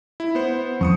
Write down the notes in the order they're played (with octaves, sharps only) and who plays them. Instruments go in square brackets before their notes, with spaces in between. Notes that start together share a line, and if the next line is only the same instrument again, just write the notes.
[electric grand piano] E4
B3 C5
[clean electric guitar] F2 [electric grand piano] C#6 D#6 C#7